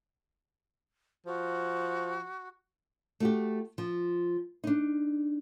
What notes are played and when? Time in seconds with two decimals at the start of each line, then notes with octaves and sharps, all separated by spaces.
1.26 F3 F#4
3.20 A3 F#4 G4
3.78 F3
4.64 D4 D#4